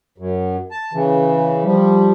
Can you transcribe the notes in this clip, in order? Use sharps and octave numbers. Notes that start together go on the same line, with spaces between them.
F#2
A5
C#3 E3
F3 G3